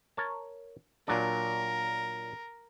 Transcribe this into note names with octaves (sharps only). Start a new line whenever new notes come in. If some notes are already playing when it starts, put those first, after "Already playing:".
A#4 C#5 A5
A#2 F#3 D4 A#4